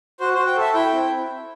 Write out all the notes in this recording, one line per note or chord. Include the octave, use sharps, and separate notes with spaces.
F#4 C5
F#4 C5
G5
A4 E5
E4 G5
C4